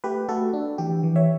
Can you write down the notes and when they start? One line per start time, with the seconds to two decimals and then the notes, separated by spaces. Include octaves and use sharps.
0.04 A3 G4 B4
0.28 A3 F#4 A4
0.53 D4
0.78 E3 G4
1.03 E3
1.16 C#5 E5